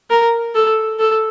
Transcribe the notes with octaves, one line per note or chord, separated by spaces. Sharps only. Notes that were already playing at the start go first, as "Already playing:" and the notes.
A#4
A4
A4